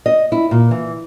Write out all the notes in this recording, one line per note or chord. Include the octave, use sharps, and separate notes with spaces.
D#5
E4
A#2
E3